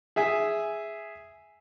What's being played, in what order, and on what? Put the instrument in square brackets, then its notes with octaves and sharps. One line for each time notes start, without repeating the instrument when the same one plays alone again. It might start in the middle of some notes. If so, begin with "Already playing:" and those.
[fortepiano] G#4 E5 G#5